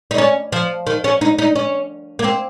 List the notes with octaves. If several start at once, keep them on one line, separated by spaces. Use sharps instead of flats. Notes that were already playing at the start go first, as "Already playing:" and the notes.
D#4
C#4
F3
D#3
C#4
D#4
D#4
C#4
A#3
C4